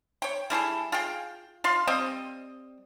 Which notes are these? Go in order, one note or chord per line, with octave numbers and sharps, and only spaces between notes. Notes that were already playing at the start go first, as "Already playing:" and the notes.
C#5 G5
G3 E4 G#4 A4
F4 G#4 F5 G5
F4 F5 C6
G3 C4 D#5